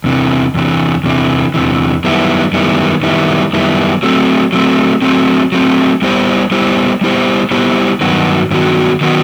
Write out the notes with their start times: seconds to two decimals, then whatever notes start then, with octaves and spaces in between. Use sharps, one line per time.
0.04 E2 C3 E3
0.54 E2 C3 E3
1.04 E2 C3 E3
1.54 E2 C3 E3
2.04 F#2 D#3 G3 B3 E4
2.53 F#2 D#3 G3 B3 E4
3.03 F#2 D#3 G3 B3 E4
3.53 F#2 D#3 G3 B3 E4
4.03 F#3 A3 C4
4.53 F#3 A3 C4
5.02 F#3 A3 C4
5.52 F#3 A3 C4
6.02 G3 B3 E4 G4 C5
6.51 G3 B3 E4 G4 C5
7.01 G3 B3 E4 G4 C5
7.51 G3 B3 E4 G4 C5
8.01 G2 D#3 F#3 B3 F#4
8.51 G2 D#3 F#3 B3 F#4
9.01 D#3 F#3 B3 F#4